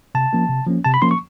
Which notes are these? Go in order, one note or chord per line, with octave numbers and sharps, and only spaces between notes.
C3 A5
F3 A#3 C#4
C3
F3 A#3 C#4
C3 A5
B5
F3 A#3 C#4 C6
C#6